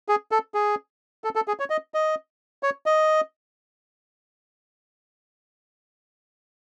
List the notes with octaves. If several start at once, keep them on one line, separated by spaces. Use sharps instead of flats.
G#4
A4
G#4
A4
A4
G#4
C#5
D#5
D#5
C#5
D#5